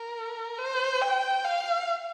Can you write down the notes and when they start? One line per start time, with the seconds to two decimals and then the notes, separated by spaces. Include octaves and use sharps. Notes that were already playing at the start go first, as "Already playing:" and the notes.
Already playing: A#4
0.58 C5
1.01 G5
1.44 F5